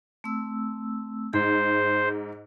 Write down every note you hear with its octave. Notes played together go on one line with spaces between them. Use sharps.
A3 C4 E6
G#2 G#4 C5